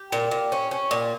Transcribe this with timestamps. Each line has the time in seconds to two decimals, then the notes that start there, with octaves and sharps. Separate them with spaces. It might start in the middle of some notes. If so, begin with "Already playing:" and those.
Already playing: G4
0.12 A#2
0.31 A#2
0.52 C#4
0.71 C#4
0.91 A#2